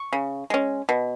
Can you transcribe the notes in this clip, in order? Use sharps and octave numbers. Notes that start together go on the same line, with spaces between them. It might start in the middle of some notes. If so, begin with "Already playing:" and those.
Already playing: C#6
C#3
G#3 C#4
B2